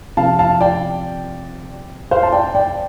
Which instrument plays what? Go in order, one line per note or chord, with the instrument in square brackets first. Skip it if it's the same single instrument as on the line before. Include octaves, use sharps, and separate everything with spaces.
[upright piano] C3 F3 C4 F5 A5
F5 A5
D5 G5
C5 F5
A5
D5 G5
D5 G5